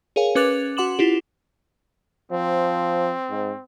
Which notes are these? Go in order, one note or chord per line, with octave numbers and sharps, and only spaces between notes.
G#4 A#4 C#5 F5 G#5
C#4 B4 D6 F#6 A6 F7
F#4 F#5 C6 D6 E7 F#7
E4 F4 G4
F3 C4
G#2